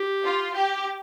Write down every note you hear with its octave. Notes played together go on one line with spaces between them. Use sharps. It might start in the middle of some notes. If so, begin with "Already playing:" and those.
Already playing: G4
F4
G4